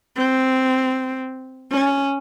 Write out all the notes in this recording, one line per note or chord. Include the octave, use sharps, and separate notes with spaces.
C4
C#4